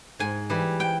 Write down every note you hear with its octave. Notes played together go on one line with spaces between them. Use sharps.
G#2 G#5
E3 G3
G5